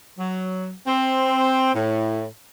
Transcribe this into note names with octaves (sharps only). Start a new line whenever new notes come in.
F#3
C4
A2